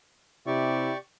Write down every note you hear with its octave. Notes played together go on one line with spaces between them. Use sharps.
C3 E4 G4 D5 C#6